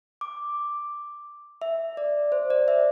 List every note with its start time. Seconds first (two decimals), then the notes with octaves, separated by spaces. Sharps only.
0.21 D6
1.62 E5
1.97 D5
2.32 C5
2.50 D5
2.68 E5